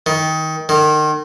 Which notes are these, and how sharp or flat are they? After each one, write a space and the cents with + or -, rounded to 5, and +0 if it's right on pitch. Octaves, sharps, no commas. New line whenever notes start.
D#3 +20
D#3 -30